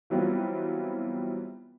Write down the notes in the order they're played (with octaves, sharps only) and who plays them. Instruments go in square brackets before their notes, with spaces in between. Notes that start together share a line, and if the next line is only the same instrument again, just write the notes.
[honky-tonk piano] E3 F#3 G3 B3 C4 F4